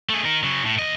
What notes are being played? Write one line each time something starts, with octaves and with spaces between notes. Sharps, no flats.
A3 G#4
D#4 A#4
C#3 F#3
A2
D#2 D#5